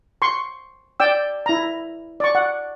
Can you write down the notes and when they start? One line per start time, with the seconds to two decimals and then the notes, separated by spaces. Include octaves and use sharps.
0.22 C6 C#6
1.00 D5 G5 E6
1.46 E4 A#5
2.20 D5 C#6
2.35 F#5